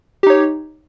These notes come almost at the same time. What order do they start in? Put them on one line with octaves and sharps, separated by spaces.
G4 D#4 C#5